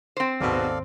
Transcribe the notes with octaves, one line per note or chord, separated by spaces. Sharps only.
C4 C5
G#1 D#2 G#2 B2 A4 D5 F5